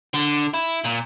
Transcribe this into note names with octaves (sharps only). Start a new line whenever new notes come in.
D3
E4
A#2